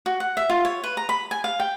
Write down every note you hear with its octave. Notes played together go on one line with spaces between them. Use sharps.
F#4
F#5
E5
F4
C#5
B4
A#5
B5
G#5
F5
G5